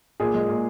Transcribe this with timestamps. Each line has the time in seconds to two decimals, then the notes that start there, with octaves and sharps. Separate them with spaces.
0.20 A#2 G#4
0.34 G#3
0.49 A#2